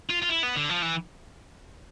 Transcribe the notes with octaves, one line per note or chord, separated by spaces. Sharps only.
F4
F4
E4
B3
D3
F3
E3